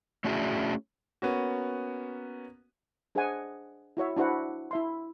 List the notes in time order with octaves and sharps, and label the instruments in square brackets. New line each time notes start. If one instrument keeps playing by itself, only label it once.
[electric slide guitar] A3 C#4 D4 E4 F#4 G#4
[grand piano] A#3 B3 C#4 F#4
[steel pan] D4 G#4 C5 D#5 F#5 G#5
E4 F#4 C#5 E5
D4 E4 F#4 C5 F#5
E4 E5 C6